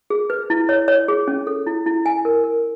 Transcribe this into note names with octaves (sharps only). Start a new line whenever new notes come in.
G#4
B4
E4
C#5
C#5
G#4
C#4
A4
E4
E4
G#5
A#4
A#4